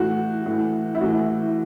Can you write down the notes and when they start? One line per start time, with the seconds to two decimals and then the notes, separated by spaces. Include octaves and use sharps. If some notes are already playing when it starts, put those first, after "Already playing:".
Already playing: A2 E3 F#4
0.46 A2 E3
0.95 E4
1.01 A2 E3 F#4